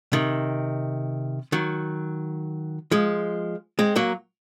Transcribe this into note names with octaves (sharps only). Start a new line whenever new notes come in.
C3 D#3
D#3 F#3
F3 G#3
G#3 C4
F#3 A#3